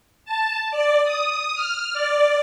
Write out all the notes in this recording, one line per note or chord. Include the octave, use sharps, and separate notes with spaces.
A5
D5
D#6
F6
D5